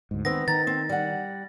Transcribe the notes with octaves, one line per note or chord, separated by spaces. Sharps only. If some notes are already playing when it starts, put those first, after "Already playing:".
D2 G#2
D#3 B3 C4 A#6
D#3 A#5 A6
C4
G3 F#5